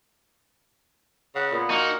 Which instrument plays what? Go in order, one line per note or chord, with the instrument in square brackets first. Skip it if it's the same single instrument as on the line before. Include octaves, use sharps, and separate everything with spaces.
[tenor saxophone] C#3 [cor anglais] F#5
[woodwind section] A#2 [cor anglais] B3
[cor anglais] A#3 [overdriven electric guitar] D#4 [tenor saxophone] F#4